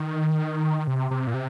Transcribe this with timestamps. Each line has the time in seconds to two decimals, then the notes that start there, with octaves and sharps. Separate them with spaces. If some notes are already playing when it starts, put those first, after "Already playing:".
Already playing: D#3
0.87 C3
1.11 C3
1.27 A#2
1.34 C3